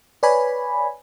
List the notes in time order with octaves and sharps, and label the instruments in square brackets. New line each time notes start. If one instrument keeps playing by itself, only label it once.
[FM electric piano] B4 C#5 D5 G#5 B5